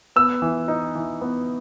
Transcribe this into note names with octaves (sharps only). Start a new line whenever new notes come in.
B3 E6
E3
D#4
E3
B3